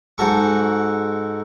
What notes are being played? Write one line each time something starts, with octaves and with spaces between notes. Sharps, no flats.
G#2 F#4 A4 C#6